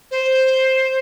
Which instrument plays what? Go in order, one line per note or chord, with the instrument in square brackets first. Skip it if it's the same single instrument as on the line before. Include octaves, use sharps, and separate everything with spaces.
[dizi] C5